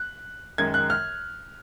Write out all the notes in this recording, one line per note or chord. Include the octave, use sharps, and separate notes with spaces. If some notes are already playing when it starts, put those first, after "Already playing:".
Already playing: F#6
F#2 D#3 G#3 G#6
F#6
F6